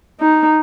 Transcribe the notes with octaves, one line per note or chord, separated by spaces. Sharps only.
D#4